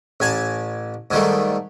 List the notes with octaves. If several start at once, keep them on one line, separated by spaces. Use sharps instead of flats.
A1 G#5 A5
G#2 D#3 G3 A3